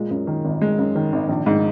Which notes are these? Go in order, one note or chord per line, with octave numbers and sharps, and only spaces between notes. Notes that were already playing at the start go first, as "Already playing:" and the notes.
Already playing: A#2 G#3
F#2
D#3
G#1
G#3
F#2
D#3
G#1
A#1
G#2